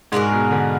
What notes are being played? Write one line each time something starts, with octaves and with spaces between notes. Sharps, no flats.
G#2 G#3 D4 F#4 A#4
B2
D3